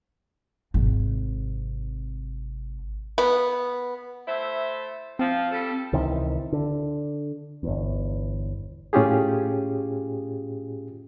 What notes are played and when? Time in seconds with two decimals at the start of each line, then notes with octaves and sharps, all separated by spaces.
0.74 G#1 C3
3.18 B3
4.28 A3 E4 C5
5.19 F3 C4
5.51 G3 A4
5.93 C#2 C3 D#3 E3
6.52 D3
7.63 G1 E2
8.93 A2 C#4 F4 G4 G#4